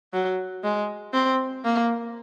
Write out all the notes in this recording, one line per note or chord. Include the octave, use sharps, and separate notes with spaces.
F#3
G#3
C4
A#3